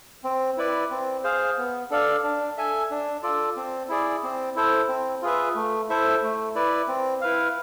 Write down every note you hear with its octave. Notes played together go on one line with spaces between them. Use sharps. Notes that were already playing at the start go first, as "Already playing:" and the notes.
C4
E4 B4 D5
C4
G#4 C5 F5
B3
D4 A4 D5 F5
D4
A4 E5 G#5
D4
F4 A4 D5
C4
E4 G#4 D5
C4
E4 A4 C5
C4
F4 G#4 B4 E5
A3
E4 A4 C5 E5
A3
E4 B4 D5
C4
E4 B4 F5